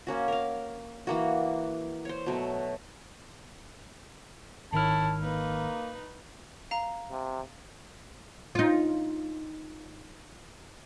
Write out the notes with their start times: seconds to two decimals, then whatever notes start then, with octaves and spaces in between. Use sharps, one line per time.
0.07 A#3 C#4 F#4
0.28 A#4 F5
1.07 E3 A#3 F#4
2.05 C5 C#5
2.26 B2 F#3 A3
4.73 G#1 D#3 E4 C#5 A5 F6
5.20 A#3 D#4 B4
6.71 F5 A#5
7.11 C3
8.55 D#4 F4